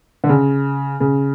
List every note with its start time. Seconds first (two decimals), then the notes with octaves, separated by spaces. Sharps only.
0.24 D3
0.29 C#3
1.00 C#3